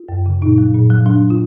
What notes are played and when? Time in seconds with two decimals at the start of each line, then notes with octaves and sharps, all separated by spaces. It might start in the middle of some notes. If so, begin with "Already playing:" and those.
Already playing: F4
0.09 F#2
0.26 C#3
0.42 A#2 D#4
0.58 F#3
0.75 A#2
0.90 F#3
1.06 F#3 D4
1.30 F4